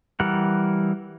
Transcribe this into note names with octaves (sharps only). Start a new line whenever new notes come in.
E3 G3 A#4 F#5